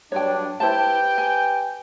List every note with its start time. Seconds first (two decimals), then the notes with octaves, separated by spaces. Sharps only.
0.12 G2 F#3 D4 C#5 G5
0.60 E4 G4 B4 C5 G5 A5
1.18 G#5